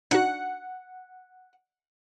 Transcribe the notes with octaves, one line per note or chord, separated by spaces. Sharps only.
D4 D#4 F#4 F#5